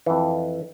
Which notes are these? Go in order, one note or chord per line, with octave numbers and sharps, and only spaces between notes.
F2 E3